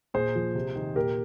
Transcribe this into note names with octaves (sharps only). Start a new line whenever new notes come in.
A#2 G#4 C5
F3
C3
D#3
A#2 G4 A#4